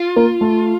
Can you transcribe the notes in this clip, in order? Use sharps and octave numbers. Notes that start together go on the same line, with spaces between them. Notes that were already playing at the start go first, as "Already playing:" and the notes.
Already playing: F4
A#3
A3